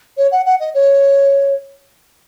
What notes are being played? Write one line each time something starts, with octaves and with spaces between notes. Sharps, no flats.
C#5
F#5
F#5
D#5
C#5